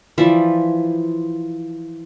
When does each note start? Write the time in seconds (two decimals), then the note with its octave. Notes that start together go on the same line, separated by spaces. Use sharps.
0.18 E3 F3 D5 E5